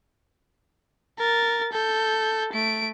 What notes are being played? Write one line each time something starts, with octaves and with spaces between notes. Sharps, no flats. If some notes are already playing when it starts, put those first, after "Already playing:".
A#4 A6
A4 G6
A3 D7